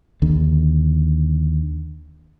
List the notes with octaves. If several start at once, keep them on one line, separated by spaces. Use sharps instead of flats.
D#2 D3